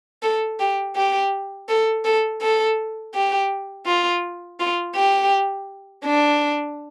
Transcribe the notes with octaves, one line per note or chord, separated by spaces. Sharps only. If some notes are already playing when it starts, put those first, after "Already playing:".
A4
G4
G4
A4
A4
A4
G4
F4
F4
G4
D4